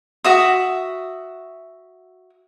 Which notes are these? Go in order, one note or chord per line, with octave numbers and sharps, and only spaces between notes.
F#4 E5 D#6